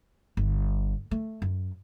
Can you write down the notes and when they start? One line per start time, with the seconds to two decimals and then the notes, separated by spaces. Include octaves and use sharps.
0.37 G1
1.11 A3
1.42 F#2